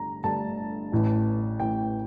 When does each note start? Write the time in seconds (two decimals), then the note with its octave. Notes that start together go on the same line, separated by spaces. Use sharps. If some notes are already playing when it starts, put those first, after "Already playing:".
Already playing: G1 G2 D3 A3 A#5
0.24 G1 G2 D3 A3 A5
0.92 A1 A2 E3
1.60 A1 A2 E3 G5